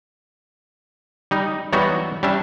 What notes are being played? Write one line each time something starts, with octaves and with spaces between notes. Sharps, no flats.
G3 D#4
E3 F#3 G3 B3 D#4 F#4
G3 C#4 D4 E5